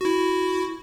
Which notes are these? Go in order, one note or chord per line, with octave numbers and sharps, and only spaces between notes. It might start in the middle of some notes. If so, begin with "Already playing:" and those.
E4 F#4